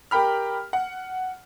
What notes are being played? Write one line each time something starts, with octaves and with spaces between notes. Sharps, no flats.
G4 A#4 G5 B5 F6
F#5